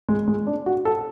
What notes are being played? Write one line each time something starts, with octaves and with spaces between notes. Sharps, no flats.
G#3
G#3
D4
F#4
A4